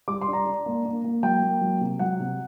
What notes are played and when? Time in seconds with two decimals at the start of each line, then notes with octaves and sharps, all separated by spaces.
0.08 G3 D6
0.21 C6
0.28 D4
0.33 A#5
0.46 D4
0.66 A#3
0.85 A#3
1.04 A#3
1.23 F#3 G5
1.42 A#3
1.61 F#3
1.81 C3
1.99 F#3 F#5
2.20 C3